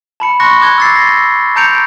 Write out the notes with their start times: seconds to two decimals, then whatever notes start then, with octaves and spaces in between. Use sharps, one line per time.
0.20 A5 B5 C#7
0.40 C6 C#6 F#6 A#6 C#7
0.61 A5 D6 F#6 G#6 G7
0.78 E6 A6 C7
0.96 A#6
1.56 A5 A#5 G6 C#7 D7 F7